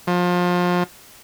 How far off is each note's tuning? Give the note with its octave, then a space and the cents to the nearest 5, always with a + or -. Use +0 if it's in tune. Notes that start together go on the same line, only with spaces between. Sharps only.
F3 +30